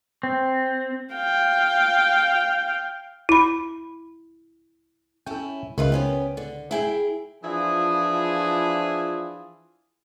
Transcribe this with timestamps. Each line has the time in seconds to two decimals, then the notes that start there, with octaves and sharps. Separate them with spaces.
0.23 C4
1.14 F5 G5
3.29 E4 B5
5.26 C#4 E4 A4 G5
5.78 C#2 D#3 F4 B4 E5
5.92 B3 C#4 G4
6.37 D3
6.71 E4 G#4 G5
7.43 E3 F3 D4 E4 F4 G#4